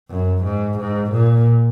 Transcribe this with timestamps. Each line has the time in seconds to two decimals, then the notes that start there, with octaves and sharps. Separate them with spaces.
0.10 F#2
0.45 G#2
0.79 G#2
1.12 A#2